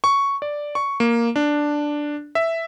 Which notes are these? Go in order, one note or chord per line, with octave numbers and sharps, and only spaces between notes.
C#6
D5
C#6
A#3
D4
E5